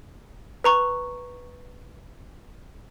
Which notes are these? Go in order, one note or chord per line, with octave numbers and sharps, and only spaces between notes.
B4 A#5 C#6